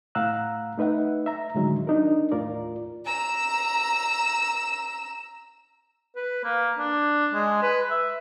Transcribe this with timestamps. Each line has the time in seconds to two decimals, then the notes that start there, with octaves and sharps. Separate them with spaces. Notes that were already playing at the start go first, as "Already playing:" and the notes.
0.15 A2 F5 F#5 A#5 E6 F#6
0.78 A3 D#4 B4 E5 F#5
1.26 E5 A#5
1.55 A2 D3 D#3 F#3 G#3
1.87 D4 D#4 A#4
2.32 D#2 A2 F4 A#4 D5
3.05 A#5 E6
6.16 B4
6.44 A#3
6.79 D4
7.33 G#3
7.63 B4
7.91 E5